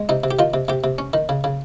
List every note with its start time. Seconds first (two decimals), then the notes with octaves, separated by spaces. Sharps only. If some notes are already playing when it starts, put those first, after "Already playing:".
Already playing: G#3
0.09 C3 D#4
0.24 C3
0.31 G4
0.39 D#3 F4
0.54 C3
0.68 C3 G4
0.84 C3
0.98 C#4
1.13 D#3
1.29 C#3
1.44 C#3